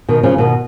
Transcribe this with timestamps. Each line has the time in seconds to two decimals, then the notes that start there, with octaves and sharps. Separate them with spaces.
0.08 B2 D#3
0.23 C#3 F3
0.38 B2 D#3